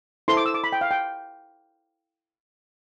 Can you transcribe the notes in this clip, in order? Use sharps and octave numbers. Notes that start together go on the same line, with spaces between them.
E4 A4 C5 C6
D6
E6
D6
B5
G5
F5
G5